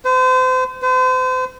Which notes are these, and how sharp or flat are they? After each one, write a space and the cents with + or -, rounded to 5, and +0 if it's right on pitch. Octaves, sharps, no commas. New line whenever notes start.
C5 -35
C5 -40